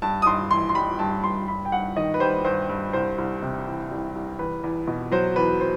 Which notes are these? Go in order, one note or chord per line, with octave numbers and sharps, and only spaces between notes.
G2 A5
D#6
G2 C6
E3 C6
C6
G3 B5
G2 A5
G2 C6
G2 B5
G5
G2 F#5
D#3 D#5
B4
G3 C5
G2 C5
G2
C2 C5
C2
C3
E3
C2
C2
E2 B4
E2
B2
F#3 C5
E2 B4
C5